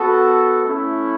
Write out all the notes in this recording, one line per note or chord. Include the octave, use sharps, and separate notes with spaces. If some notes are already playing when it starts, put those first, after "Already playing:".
Already playing: B3 F#4 A4
A3 C#4 E4